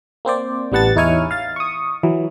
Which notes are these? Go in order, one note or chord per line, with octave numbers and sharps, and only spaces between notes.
A#3 C4 C5 D5
A1 G3 B3 F#5 A5 A6
E2 D#4 E4 C#5 G#5 F6
F5 A6
C#6 D#6
E3 F#3